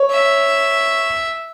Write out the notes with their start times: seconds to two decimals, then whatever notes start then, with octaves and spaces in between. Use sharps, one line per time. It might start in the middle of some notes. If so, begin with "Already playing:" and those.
Already playing: C#5
0.11 E5